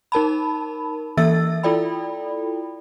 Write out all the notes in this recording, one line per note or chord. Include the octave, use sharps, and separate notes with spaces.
D#4 A#4 A5 B5
E3 A#3 A4 E5 E6 A6
E4 F4 A4 D5 G5 B5